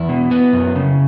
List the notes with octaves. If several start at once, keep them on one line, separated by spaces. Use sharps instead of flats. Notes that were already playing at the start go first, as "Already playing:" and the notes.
Already playing: E2 E4
B2
B3
F#2
C#3